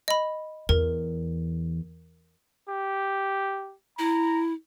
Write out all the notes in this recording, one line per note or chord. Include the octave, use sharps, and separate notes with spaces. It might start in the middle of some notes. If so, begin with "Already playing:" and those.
D#5 B5
E2 A#4
G4
E4 A#5